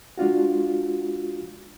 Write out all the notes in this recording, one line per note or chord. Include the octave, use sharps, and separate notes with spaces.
G#3 D4 F4 F#4